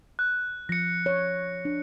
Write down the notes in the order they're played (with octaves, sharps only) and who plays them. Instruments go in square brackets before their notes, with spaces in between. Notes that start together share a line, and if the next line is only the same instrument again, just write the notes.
[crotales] F#6
[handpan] F3 [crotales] A#6 C#7
[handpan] C#5
D4